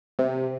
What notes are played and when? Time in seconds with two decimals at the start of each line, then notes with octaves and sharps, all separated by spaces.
0.19 C3